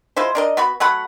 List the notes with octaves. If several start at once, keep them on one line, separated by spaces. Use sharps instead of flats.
G#3 E4 F4 C5
D4 A#4 D#5
B3 F#4 B5
F#3 A3 F#5 B5